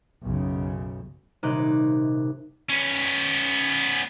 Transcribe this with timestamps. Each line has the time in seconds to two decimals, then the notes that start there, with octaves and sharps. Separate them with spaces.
0.22 B1 F#2 C#3
1.43 D#1 C3 D#4 C#5 D6 F#6
2.70 B3 C#4